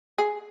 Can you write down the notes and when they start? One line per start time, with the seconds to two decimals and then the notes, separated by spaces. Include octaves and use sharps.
0.18 G#4